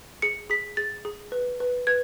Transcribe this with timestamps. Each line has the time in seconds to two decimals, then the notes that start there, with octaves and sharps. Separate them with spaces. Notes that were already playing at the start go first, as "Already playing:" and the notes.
0.22 G#4 C#7
0.50 G#4 B6
0.77 G#4 A6
1.05 G#4
1.32 B4
1.60 B4
1.87 B4 G#6